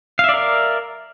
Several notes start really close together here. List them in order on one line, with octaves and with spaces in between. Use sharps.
F5 E5 D5 A#4